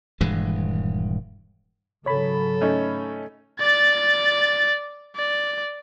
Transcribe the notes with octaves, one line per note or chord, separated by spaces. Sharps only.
D#1 G2 E3 G#3
G#1 C#3 F#3 A4 C#5 B5
A3 C#4 D#4
D5 A6
D5